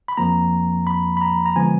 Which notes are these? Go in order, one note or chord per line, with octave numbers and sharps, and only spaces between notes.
B5
F2 F3 A#3 A#5
B5
B5
A#5
A#5
D3 F3 G#3 B3 G#5